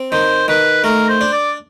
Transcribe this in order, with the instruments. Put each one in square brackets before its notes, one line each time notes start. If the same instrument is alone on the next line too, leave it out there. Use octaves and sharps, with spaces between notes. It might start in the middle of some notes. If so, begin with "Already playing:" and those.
Already playing: [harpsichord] C4
[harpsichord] D#3 [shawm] C5
[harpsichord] D#3 [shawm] B4
[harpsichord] A3 [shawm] A#4
[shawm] C5
[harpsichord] D4
[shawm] D5